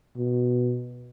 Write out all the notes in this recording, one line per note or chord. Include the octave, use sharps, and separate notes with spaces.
B2